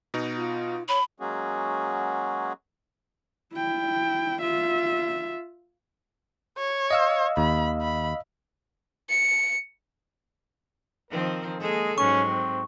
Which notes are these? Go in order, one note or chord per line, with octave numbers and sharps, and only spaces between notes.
B2 B3 D#4
F4
C#5 B5
F#3 G#3 A#3 C#4 F#4 G#4
E4 G5
F4 E5
C#5
D#5 F5 E6
D#2 B5
B5
C#7
D#3 F3 C4 A#4
G#3 A#3 G#4 A4
G#2 F#3 C#4 C#6
C4